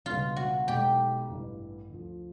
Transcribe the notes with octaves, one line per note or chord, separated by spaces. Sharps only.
C#2 B2 G3 B3 F4
F#4
B1 B2 G#3 G4
A1 G2 E3
D2 D3 F3